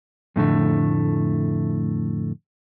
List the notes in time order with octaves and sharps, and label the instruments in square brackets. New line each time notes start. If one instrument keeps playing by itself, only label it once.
[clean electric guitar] F2 A2 D3 A3